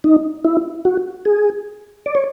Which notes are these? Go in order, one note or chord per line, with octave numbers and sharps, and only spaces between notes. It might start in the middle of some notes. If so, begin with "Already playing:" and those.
D#4
E4
F#4
G#4
D5
C#5